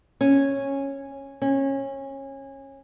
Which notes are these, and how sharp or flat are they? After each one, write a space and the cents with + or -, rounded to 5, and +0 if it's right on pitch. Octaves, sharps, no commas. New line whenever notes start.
C#4 -10
C#4 -25